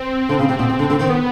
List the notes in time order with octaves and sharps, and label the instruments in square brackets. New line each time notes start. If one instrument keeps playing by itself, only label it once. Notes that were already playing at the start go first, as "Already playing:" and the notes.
Already playing: [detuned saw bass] C4
[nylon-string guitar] D3
C#3
C3
B2
C3
D3
D3
D#3
[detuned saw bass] B3